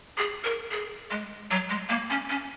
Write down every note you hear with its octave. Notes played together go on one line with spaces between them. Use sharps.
G#4
A#4
G#4
G#3
F#3
G#3
A#3
C#4
C#4